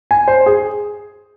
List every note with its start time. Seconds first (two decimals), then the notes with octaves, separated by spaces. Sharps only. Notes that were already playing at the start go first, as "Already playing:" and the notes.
0.11 G#5
0.28 C5
0.46 G#4